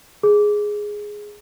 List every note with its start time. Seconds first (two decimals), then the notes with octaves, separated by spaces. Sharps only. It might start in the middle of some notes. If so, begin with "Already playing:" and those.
0.23 G#4